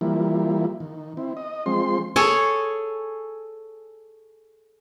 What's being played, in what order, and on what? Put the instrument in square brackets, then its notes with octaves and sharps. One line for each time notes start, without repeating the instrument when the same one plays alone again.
[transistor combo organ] E3 F3 G3 A#3 E4
D#3
C4 E4
D#5
F3 G#3 C4 C6
[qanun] G#4 A4 C#5